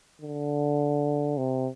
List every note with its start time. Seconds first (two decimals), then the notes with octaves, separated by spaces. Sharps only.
0.22 D3
1.38 C3